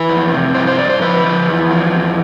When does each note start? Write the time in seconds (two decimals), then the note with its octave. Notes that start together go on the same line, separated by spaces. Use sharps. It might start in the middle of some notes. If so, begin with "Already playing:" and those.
Already playing: E3 B4
0.09 F2
0.33 C3
0.55 G2 C5
0.67 C5
0.78 G2 D5
0.90 C5
1.01 F3 B4
1.24 F3
1.48 E2
1.71 F3
1.94 E2